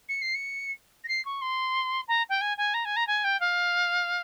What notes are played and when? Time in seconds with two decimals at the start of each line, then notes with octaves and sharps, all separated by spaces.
0.09 C#7
0.22 C7
0.35 C#7
1.04 A#6
1.08 C7
1.25 C#6
1.41 C6
2.08 A#5
2.29 G5
2.41 G#5
2.58 G#5
2.74 A#5
2.85 G#5
2.96 A#5
3.07 G#5
3.24 G5
3.40 F5